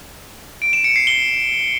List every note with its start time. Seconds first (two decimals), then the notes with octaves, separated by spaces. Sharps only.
0.62 D7
0.73 E7
0.84 C#7
0.96 C7
1.07 G7